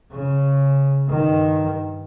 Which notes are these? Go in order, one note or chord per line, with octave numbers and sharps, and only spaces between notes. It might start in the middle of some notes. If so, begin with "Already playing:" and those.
C#3
G2 D#3